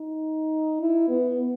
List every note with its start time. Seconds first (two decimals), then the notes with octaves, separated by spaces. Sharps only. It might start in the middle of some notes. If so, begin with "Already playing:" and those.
Already playing: D#4
0.81 E4
1.09 B3